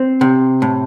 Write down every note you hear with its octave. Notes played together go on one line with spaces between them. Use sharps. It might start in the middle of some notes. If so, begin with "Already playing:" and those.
Already playing: C4
C3
A2